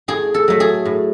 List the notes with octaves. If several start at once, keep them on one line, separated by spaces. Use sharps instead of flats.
A2 G#4
A4
F#3 A3
G#4
A2